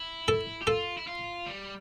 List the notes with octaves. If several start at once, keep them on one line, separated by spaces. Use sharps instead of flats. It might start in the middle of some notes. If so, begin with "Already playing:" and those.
Already playing: E4
A4
G4
F4 A4
E4
F4
G3